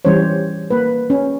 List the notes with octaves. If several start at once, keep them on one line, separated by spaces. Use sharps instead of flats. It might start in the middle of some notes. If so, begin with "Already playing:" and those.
E3 G3 C#4 C5 C#5
A#3 B4
C#4